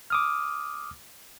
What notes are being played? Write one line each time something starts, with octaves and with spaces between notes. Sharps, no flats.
D6 D#6 F6